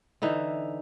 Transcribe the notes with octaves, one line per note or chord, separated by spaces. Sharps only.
D3 E3 D#4 E5